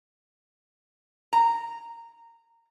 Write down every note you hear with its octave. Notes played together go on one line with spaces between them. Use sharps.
A#5